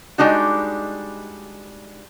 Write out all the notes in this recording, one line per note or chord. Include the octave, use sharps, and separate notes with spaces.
G3 G#3 D4 D#4 F#4